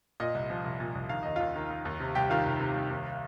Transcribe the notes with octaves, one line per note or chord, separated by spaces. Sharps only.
A#2 D#5
C2
F3
C2
A#2
C2
D#3 F5
D#2 D#5
D#2 F4 F5
D#3
D#3
D#2
C3
C2 G4 G5
D#3 F4 F5
C2
C3
C2
D#2